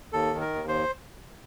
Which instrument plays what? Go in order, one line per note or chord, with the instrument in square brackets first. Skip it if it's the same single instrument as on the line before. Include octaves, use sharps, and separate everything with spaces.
[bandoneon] D#2 A4
D#3
A#4
D#2
C5